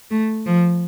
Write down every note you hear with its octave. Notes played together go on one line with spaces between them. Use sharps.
A3
F3